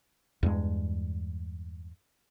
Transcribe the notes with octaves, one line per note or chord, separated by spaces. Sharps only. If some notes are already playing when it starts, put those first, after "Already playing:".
E2 G2 G#3